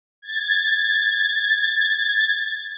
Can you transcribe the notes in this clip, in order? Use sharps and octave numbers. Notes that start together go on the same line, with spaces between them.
G#6 A6